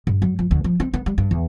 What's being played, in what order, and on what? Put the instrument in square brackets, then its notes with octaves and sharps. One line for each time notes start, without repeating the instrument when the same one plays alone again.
[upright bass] G2
F#3
F3
D2
F3
C4
B3
G3
G2
E2